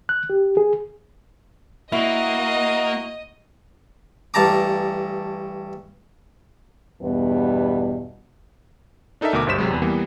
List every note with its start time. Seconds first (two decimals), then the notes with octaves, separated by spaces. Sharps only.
0.09 F#6
0.30 G4
0.57 G#4
1.92 A#3 E4 F#4 D#5
4.34 A1 G2 A5 A#5 D6
7.00 E2 G2 B2 B3
9.21 D4 D#4 A4 A#4 E5
9.33 D2 B2 A#4 E5 D6
9.47 G1 G2 C5 B6 E7
9.58 C3 F#3 G#3
9.70 E2 B4
9.82 E3 G3 A#3 B3